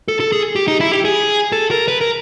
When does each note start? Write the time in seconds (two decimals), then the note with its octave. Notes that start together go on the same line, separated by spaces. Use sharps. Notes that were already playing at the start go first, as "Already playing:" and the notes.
0.08 A4
0.20 A4
0.32 G#4
0.56 G4
0.68 D#4
0.81 E4
0.92 G4
1.05 G#4
1.52 A4
1.71 A#4
1.88 B4
2.01 A#4